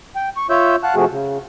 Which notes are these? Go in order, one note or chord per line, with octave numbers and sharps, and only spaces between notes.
G5
C#6
F4 C#5 E5 E6 G6
F5 F#5 A5 F#6
C3 F3 A3 F#4 G#4
C#3